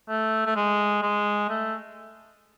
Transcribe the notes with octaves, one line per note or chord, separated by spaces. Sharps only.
A3
A3
G#3
G#3
A3